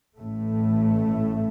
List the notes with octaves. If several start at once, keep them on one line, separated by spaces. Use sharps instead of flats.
A1 A2 A3